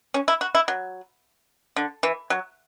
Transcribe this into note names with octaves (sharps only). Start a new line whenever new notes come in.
C#4
E4
F#4
E4
F#3
D3
E3
F#3